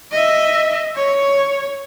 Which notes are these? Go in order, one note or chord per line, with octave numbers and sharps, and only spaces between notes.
D#5 E5
C#5